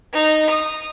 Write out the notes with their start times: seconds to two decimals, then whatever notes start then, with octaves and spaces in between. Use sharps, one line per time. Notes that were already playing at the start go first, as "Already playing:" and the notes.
0.13 D#4
0.50 D#6